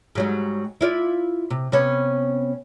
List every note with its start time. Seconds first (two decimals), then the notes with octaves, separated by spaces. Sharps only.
0.15 G#2 F#3 G3
0.81 E4 F4 D5
1.50 C3
1.72 C3 B3 C#4